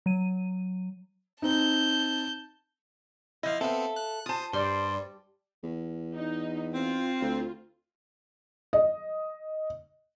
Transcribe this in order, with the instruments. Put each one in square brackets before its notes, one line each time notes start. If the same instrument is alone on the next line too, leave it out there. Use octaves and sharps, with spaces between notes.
[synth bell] F#3 D#7
[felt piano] C4 D#4 [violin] A5 G6
[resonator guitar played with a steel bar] F3 D#5 [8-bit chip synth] E4 F5
[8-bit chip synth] B3 C4 [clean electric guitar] A4 [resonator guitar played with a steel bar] E5 F5
[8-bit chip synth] F#6
[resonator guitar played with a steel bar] F4 A5 [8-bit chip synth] C5 D#6
[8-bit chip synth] G2 [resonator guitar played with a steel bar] G3 [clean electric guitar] C5 [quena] D5
[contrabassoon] E2
[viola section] D#4
[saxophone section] C4 [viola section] F4
[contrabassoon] D2
[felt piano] D#5